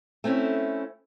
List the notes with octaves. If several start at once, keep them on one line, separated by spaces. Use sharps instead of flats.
A3 C4 C#4 E4